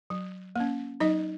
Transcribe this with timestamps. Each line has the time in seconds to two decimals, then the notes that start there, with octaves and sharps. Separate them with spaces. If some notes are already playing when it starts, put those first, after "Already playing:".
0.10 F#3
0.56 A#3 C#4
1.00 F#3 D#4 D#5